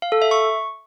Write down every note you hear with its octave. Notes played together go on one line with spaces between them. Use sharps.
F5
A4
E5
C#6